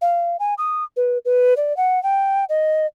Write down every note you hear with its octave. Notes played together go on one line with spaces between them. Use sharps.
F5
G#5
D#6
B4
B4
D5
F#5
G5
D#5